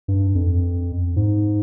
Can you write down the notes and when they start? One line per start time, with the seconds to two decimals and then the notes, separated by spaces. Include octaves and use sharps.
0.08 G2
0.35 F2
1.16 G#2